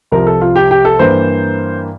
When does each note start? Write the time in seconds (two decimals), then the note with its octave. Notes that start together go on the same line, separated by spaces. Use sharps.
0.12 C2 C3 F3 A#4
0.27 A4
0.41 F4
0.56 G4
0.71 G4
0.85 A4
0.99 G2 E3 A#3 C5